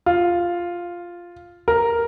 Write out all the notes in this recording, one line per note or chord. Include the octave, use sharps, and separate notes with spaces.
F4
A#4